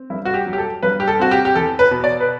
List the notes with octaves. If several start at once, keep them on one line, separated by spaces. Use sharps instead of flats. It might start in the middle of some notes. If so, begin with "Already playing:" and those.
Already playing: C4
G2 E4
F#4
G4
F#3
G4
A4
G2 B4
G4
A4
C4 F#4
G4
G4
E2 A4
B4
B2
D5
B4